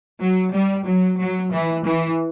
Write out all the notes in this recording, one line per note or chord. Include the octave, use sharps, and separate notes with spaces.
F#3
G3
F#3
F#3
E3
E3